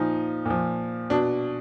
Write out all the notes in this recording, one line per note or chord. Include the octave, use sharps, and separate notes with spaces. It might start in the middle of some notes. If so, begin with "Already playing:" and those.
Already playing: A#2 F3 D#4
A#2 F3
B2 D4